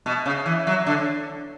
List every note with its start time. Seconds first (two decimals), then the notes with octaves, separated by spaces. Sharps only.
0.06 B2
0.26 C#3
0.46 E3
0.67 F#3
0.86 D3